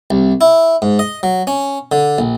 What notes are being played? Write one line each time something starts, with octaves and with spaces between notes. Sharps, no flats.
C2
E4
G#2
D#5
F#3
C#4
D3
A#1